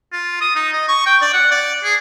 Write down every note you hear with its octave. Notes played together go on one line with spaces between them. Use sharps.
F4
D#6
D#4
D#5
C#6
G5
D5
F#5
D5
G#4